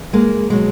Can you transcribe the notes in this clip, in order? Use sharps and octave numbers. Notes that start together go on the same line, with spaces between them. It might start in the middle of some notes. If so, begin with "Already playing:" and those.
Already playing: E2 C#3
G#3 A#3
B2 F#3 G#3